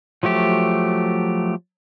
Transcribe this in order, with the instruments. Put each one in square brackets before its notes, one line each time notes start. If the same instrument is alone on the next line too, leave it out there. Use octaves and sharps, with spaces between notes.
[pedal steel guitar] F3 F#3 A3 G4